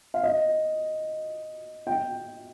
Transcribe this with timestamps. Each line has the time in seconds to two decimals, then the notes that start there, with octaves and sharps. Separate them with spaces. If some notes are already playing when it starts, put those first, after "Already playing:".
0.14 F5
0.24 D#5
1.87 G5